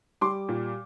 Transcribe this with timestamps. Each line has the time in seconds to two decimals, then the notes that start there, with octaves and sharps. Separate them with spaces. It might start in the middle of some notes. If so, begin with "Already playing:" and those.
0.21 G3 C6 D6
0.49 A#2